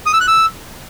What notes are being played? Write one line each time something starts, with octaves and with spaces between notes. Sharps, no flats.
D#6
E6
F#6
E6